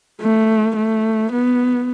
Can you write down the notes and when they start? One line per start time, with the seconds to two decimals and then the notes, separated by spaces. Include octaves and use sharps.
0.21 A3
0.77 A3
1.32 B3